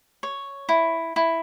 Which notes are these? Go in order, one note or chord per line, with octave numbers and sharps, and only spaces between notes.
C#5
E4
E4